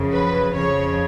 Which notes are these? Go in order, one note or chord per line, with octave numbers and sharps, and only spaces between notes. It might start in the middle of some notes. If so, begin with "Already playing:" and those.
Already playing: F#2 C#3 F3
B4
F2 C#3 F3 C#5